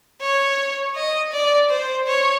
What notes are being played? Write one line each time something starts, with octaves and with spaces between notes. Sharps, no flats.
C#5
D#5
D5
C5
C#5